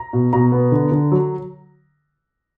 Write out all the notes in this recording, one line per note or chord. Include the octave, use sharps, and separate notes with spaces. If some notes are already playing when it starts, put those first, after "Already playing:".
Already playing: A#5
B2
B2 A#5
B3
D3
D3
F#3